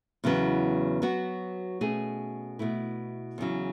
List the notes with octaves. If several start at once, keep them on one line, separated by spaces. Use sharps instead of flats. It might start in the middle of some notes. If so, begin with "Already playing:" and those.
E2 C#3 F#3 B3
F#3 B3 F#4
B2 A3 C#4 G#4
B2 A3 E4
E2 C#3 F#3